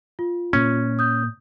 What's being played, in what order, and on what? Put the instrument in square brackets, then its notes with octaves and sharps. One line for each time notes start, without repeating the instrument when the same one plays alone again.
[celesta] F4
[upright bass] A#2 [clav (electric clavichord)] C#4
[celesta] D#6 G6